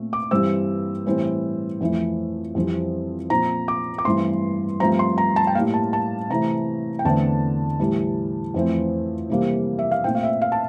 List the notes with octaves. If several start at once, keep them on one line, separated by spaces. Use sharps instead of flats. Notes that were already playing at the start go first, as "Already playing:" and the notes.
Already playing: A#2 A3 C4
D6
G2 E3 G3 C4 E6
A2 E3 G3 C4
F2 E3 A3
F2 E3 G3 C4
A#2 F3 C4 A#5
D6
D6
G2 E3 A3 C4 C6
G2 F3 A3 C4 A#5
C6
A#5
A5
G5
A2 G3 A#3 F5
A5
A5
C3 E3 A3 A#5
G5
E2 D3 A3 C4 A5
A2 E3 G3
F2 E3 A3 C4
C3 E3 G3 A#3
E5
F5
A#2 A3 C4 G5
F5
E5
F5
A5